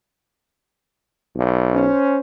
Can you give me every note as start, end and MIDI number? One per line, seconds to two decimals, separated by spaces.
1.36 1.87 35
1.73 2.19 61
1.73 2.19 72